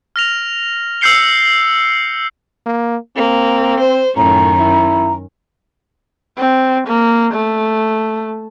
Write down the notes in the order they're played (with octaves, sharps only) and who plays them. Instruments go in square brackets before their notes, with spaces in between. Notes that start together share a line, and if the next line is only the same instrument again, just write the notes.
[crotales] F6 A#6 F7
E6 F6 G6 C7 C#7 G7
[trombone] A#3
[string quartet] A#3 [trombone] C4
[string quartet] C5
[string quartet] F#2 D#3 C#4 [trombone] A2 [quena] A#5
[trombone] E4
[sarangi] C4
A#3
A3